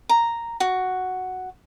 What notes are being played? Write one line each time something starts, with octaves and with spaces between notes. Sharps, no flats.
A#5
F#4